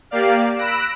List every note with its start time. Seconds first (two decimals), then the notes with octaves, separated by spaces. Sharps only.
0.11 A#3 G4 D5 F5
0.56 B5 E6 F#6 A#6 D7 E7